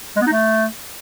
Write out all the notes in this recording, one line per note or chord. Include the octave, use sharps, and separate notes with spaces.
G#3
B3
D#4
A3